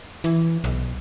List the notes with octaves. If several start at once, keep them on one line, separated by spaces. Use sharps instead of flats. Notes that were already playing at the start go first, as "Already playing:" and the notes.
E3
B1